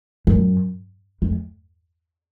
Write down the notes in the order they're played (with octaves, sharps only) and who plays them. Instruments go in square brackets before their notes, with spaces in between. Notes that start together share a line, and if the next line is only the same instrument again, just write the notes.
[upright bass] F#2
F2